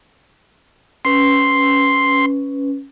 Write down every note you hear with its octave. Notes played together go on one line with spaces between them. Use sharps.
C#4 B4 C6